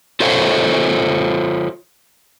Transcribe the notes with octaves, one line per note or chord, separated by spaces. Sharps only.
F4 A4 C5 C#5 F5